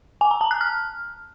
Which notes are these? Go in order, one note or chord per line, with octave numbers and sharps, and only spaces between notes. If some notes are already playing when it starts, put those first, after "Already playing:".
G#5
A#5
A5
F#6
F6